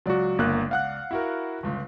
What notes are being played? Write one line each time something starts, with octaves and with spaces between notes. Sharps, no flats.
C#2 F#3 F#4 D5
G1 A#3 F#6
F5 F#5 F#6
E4 F#4 A#4
G1 C#2